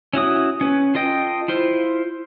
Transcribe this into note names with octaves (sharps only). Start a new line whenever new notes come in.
C#4 E4 F#4 D#6
C#4 B4
F4 A4 D#5 G5
E4 F4 C5